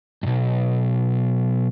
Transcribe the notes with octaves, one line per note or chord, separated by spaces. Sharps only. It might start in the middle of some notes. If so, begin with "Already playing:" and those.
B1 G2